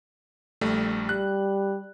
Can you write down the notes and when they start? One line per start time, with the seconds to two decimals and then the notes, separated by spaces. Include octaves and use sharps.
0.61 A#1 G3 A3
1.09 G3 F#6